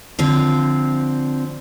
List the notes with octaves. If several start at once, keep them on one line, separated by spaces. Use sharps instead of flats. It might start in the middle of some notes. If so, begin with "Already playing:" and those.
D3 F3 C4